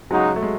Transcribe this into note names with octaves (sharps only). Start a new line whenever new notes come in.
C#3 F#3 G#3 D#4 F#4
A3
G#3